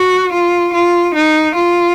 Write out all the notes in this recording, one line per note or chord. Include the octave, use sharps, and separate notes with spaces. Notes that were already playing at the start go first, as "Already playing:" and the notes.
Already playing: F#4
F4
F4
D#4
F4